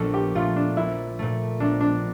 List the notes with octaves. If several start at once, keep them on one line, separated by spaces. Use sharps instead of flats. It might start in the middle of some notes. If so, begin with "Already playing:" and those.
Already playing: A#1 A#2 A4
G4
A#2 A3 F4
D4
A#1 E4
A#2 A3
A#1 D4
D4